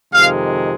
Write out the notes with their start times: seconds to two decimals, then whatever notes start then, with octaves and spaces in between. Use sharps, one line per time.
0.13 F2 C3 D#3 G#3 F5